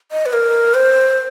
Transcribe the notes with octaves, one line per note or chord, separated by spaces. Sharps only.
D#5
B4
A#4
C5